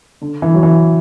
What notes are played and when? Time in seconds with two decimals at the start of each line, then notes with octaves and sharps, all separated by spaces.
0.21 D3
0.42 E3
0.54 F#3
0.63 E3